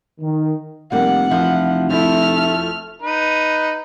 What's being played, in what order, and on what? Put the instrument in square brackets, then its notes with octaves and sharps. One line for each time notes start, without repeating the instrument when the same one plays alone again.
[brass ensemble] D#3
[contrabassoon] F1 [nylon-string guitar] G3 A#3 [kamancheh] F#5
[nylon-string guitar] E3 F3 E4
[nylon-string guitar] F3 C4 E4 [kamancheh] A3 F6
[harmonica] D#4 B4